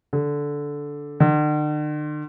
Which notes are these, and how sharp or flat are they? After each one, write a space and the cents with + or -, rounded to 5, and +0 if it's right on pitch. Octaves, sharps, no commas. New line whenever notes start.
D3 -10
D3 +45